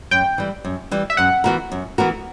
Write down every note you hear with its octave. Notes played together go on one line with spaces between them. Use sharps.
F#2 G5
E3 G3
F#2
E3 G3
E5
F#2 F#5
E3 B3 F#4 A#4
F#2
E3 B3 F#4 A#4